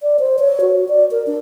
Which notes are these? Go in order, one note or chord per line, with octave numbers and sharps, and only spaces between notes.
D5
C5
C#5
F#4
D5
A#4
D4